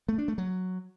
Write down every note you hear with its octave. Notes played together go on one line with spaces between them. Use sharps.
A3
D4
A3
F#3